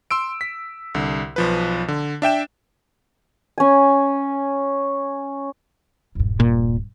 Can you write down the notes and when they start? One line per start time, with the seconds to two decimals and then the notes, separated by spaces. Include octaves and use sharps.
0.11 C6 E6 D7
0.41 B6
0.95 C2 D3
1.36 B1 F3 B4
1.88 D3
2.22 D4 E5 G5 E7
3.58 C#4 G#5
6.15 D#1 G2
6.40 A#2